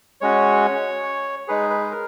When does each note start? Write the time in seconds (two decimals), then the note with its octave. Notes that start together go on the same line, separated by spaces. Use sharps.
0.21 G#3 C#4 F#4 C#5
1.48 G#3 D#4 G#4 B4
1.70 B4
1.91 A#4